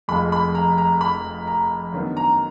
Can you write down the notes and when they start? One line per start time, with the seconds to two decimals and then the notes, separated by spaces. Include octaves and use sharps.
0.08 F1 F2 F3 G#3 B5
0.32 B5
0.55 A#5
0.78 A#5
1.01 B5
1.47 A#5
1.92 F#2 D#3 F#3 B3 D4
2.17 A#5